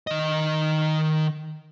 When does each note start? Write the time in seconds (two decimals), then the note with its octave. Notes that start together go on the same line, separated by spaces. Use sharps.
0.07 D#3 D#5